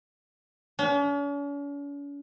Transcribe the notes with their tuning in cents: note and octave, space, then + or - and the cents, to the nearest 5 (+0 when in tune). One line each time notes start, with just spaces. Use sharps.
C#4 +45